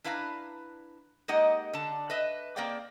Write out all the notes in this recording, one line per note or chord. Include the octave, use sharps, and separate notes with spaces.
D4 E4 B4 F5 G#5 A#5
G#3 A#3 D#4 G4 D#5 F#5
D3 A5
B4 D#5 E5
A#3 C4 G#4 D5 F5 G5